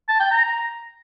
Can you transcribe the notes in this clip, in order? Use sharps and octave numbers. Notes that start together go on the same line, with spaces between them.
A5
G5
A#5